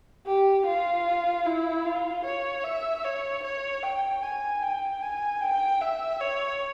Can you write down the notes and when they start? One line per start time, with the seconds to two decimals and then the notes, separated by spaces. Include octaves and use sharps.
0.26 G4
0.66 F4
1.46 E4
1.85 F4
2.25 C#5
2.64 E5
3.04 C#5
3.43 C#5
3.83 G5
4.23 G#5
4.62 G5
5.02 G#5
5.41 G5
5.82 E5
6.21 C#5